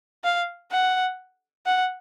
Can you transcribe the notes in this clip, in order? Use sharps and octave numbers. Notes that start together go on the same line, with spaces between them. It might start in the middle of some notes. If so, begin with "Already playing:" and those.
F5
F#5
F#5